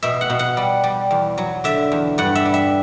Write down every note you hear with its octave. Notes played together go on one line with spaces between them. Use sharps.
B2 E5
F#5
B2
F#5
G3
G3
E2
F#3
D3 E5
E2
G2 F#5
E5
G3
E5